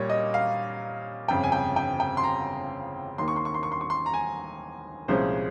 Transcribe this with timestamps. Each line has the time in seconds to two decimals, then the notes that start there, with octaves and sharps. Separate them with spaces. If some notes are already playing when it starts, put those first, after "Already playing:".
Already playing: A#2 G3 A#3 C#5
0.10 D#5
0.34 F5
1.28 G1 F2 C#3 G5
1.43 G#5
1.52 G5
1.76 G5
2.00 G5
2.17 C6
2.23 A#5
3.18 D#2 D#3 A#3 C6
3.28 C#6
3.36 C6
3.45 C#6
3.54 C6
3.63 C#6
3.72 C6
3.81 C#6
3.90 C6
4.06 A#5
4.14 G#5
5.08 C2 A#2 F3 G#3 C#4 C5